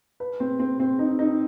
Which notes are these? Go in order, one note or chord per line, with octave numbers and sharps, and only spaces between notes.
B4
C4
C4
C4
D#4
D#4